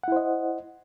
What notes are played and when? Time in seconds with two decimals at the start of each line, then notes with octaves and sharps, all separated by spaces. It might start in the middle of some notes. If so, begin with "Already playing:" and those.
0.03 F#5
0.08 E4
0.12 C5
0.16 D#5